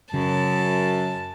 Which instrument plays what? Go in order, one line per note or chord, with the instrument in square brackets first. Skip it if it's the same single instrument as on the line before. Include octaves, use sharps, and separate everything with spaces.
[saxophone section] F#2 [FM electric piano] C#3 [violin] A5